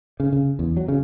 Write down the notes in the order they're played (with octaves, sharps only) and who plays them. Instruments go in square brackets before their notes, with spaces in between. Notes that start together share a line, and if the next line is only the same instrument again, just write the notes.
[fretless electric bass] C#3
C#3
E2
F#3
C#3